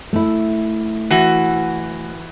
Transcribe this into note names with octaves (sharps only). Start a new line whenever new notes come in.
A3 E4
E3 F#4